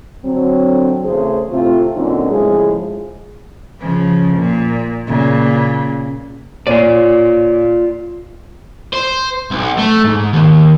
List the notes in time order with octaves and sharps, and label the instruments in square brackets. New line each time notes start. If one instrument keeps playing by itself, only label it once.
[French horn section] D3 F#3 C4
E2 C#3 A3 G#4 C5
A2 C3 A3 C4 F4
A#2 D3 F#3 C4 C#4 D#4
A2 C#3 F3 G#3 E4 G#4
[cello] C#3 F3
A#2
A#2 C#3
[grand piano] A#2 C#5 D#7 [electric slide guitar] F4 D5
[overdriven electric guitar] C5
B1
A3
G#2
D#2